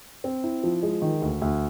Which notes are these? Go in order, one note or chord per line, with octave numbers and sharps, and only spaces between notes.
C4
E4
F3
G#3
D#3
D2
D2